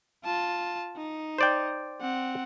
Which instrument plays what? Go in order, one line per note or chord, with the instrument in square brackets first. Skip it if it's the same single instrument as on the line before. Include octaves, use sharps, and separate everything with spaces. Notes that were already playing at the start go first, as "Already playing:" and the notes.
[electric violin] F4 A5
D#4
[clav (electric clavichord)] C5 D5 G5
[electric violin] C4 F#5